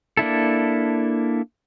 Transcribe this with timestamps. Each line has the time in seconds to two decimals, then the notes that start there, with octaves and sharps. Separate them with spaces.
0.17 A#3 D4 E4 A4